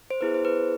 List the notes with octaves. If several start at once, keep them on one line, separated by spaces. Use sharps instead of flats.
C5
B3 E4 G#4 B4
C5
B4